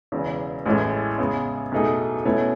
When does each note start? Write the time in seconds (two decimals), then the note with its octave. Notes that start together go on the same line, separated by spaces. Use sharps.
0.12 E1 E2 C#3
0.66 A1 A2 G#3 C#4
1.18 C#3 G#3 B3
1.72 B1 B2 A3 D#4 G#4
2.25 B2 A3 C#4 E4 B4